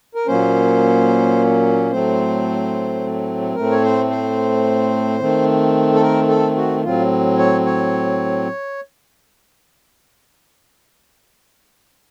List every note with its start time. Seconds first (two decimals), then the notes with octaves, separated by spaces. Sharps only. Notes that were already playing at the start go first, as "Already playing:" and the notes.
0.15 A#4
0.27 A#2 F#3 A#3 C#4 C5
1.91 A2 F#3 A3 C4 C5
3.55 A2 A3 C4 A#4
3.71 C#5
3.82 C5
4.11 C5
5.20 D#3 A3 C4
5.94 A4
6.01 A#4
6.29 A4
6.57 F#4
6.84 A2 F#3 C4 F4
7.38 C#5
7.66 C#5